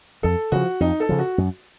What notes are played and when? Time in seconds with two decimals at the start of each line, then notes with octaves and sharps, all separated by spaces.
0.23 F2 A4
0.52 C#3 F3 F#4
0.80 F2 D#4
1.00 A4
1.09 C#3 F3
1.19 F#4
1.38 F#2